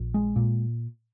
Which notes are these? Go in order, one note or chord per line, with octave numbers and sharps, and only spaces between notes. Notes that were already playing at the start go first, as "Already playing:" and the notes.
Already playing: A#1
G#3
A#2